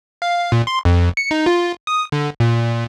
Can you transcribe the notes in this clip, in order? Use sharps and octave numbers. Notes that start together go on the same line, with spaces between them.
F5
A#2
C6
F2
C#7
D#4
F4
D#6
D3
A#2